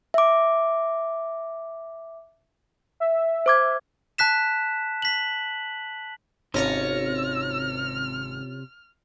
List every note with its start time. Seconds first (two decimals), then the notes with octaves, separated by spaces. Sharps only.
0.14 E5 D6
3.00 E5
3.46 C5 D6 G#6
4.18 A5 F#6 B6 E7
5.02 B6 F#7
6.54 G#1 C3 C#4 F4 C#5 F6 A#6 C#7